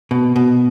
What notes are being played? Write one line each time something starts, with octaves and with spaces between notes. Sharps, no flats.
B2
B2